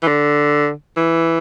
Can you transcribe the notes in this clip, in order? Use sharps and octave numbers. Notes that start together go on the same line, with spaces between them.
E3
D3
E3